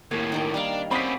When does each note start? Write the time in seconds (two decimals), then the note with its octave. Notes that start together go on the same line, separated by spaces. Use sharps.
0.11 D#2 A2 A#3 C#5 G#6
0.32 D#3 D#4 D5
0.54 G3 D4 D#4 F5
0.91 C4 C#4 F#4 D5 B5 D#6 B6